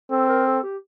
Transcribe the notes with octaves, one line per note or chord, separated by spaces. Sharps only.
C4 A4
A#4
A4
G4